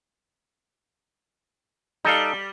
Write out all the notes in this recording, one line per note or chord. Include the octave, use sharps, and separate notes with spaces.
G3 D#4 A4 F5